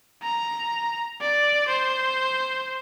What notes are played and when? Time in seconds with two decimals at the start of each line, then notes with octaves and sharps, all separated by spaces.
0.23 A#5
1.21 D5
1.68 C5